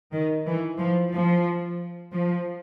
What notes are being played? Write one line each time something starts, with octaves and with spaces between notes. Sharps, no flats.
D#3
E3
F3
F3
F3